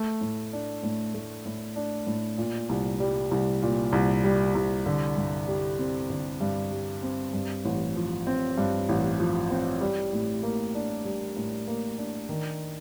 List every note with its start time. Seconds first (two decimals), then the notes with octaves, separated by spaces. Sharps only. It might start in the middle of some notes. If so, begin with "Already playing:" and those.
Already playing: A3
0.21 A2
0.53 D4
0.83 A2
1.14 A3
1.46 A2
1.76 D4
2.07 A2
2.38 A#2
2.69 C2
3.00 G3
3.31 C2
3.63 A#2
3.92 C2
4.24 G3
4.55 C2
4.86 D3
5.17 G2
5.48 G3
5.79 C4
6.10 D3
6.41 G2
6.72 G3
7.03 C4
7.34 G2
7.65 A1
7.96 F3
8.27 C4
8.58 G2
8.89 A1
9.19 F3
9.51 C4
9.81 G3
10.13 A2
10.43 A#3
10.75 D4
11.05 G3
11.36 A2
11.68 A#3
11.98 D4
12.29 D#3